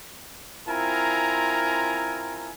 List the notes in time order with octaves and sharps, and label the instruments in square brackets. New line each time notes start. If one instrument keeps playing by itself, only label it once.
[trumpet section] C4 E4 F4 A#4 G#5 A#5